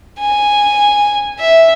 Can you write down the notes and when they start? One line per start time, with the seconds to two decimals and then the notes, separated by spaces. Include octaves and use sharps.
0.20 G#5
1.39 E5